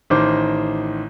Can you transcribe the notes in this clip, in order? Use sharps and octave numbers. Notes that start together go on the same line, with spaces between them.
A1 D#3 C5 D6